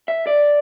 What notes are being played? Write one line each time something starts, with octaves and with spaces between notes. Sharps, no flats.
E5
D5